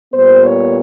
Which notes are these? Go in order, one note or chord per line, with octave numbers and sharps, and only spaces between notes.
A#2 G3 B3 C5
C#5